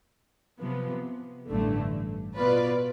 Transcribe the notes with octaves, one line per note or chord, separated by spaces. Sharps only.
C3 F3 B3
A1 G2 D3 A3
B2 B3 F4 B4 D5